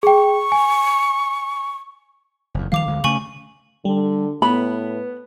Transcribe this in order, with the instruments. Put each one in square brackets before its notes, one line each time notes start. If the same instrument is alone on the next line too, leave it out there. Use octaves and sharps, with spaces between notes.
[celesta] G#4 G5 [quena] C#6
[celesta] G#5
[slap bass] F#1 E2
[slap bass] D#3 F3 G3 [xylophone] F5 D6 F7
[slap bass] D2 D3 G#3
[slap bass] C#3 A3 C#4 [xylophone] G#5 C#6 F#7
[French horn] D3 [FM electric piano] G3
[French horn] A2 [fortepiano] B3 [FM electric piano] B4 [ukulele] B5